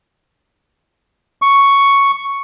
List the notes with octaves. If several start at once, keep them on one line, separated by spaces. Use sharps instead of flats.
C#6